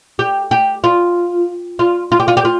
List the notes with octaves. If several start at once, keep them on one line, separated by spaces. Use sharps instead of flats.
G4
G4
F4
F4
F4
G4
F4
G4
F4